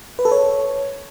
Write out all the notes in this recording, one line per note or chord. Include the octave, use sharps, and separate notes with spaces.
B4
A4
C#5